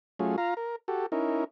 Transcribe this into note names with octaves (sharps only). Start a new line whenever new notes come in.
F#3 A3 C#4 F4 G#4
F4 F5 A#5
A#4
F#4 G4 A4
C#4 D#4 E4 A#4